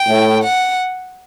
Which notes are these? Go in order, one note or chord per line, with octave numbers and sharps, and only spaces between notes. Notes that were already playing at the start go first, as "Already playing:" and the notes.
Already playing: G5
A2
F#5